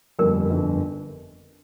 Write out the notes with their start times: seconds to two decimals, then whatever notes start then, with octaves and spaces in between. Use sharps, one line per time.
0.19 G1 F2 D3 G3 A#3 A#4
0.50 G1 F2 D3